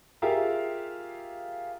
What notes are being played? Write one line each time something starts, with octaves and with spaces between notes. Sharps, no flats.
F4 G4 G#4 A#4 E5 F5